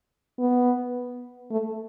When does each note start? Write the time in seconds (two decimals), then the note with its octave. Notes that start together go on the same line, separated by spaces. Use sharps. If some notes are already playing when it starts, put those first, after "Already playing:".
0.39 B3
1.51 A3